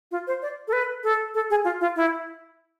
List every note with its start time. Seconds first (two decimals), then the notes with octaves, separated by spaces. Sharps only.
0.11 F4
0.27 C5
0.42 D5
0.68 A4
0.73 B4
1.04 A4
1.34 A4
1.50 G#4
1.64 F4
1.81 F4
1.96 E4